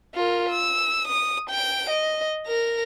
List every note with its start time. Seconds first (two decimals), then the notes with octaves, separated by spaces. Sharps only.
0.15 F4 A#4
0.49 E6
1.08 D#6
1.50 G5 D7
1.90 D#5
2.47 A#4 A#6